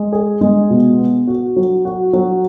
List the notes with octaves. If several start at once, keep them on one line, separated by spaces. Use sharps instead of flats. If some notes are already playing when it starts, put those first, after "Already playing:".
Already playing: G#3
G#4
G#3
B2
B3
F#4
F#3
F#4
F#3